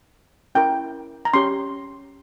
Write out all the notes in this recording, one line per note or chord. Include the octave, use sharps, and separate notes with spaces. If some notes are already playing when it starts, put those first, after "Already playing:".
C#4 E4 A#4 G5
A#5
C#4 G4 C#5 C6